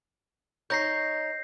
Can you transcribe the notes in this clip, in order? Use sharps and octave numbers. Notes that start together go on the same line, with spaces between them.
D#4 C#5 G6 A#6 C7